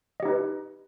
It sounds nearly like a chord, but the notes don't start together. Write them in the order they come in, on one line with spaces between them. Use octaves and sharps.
D#5 G4 D#4 B4